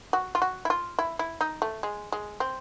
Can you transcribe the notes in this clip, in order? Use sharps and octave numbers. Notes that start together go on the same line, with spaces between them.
F#4
F4
F#4
E4
F4
E4
E4
D#4
A3
G#3
G#3
C4